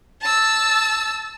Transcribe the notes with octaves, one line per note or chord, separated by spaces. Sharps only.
A5 E6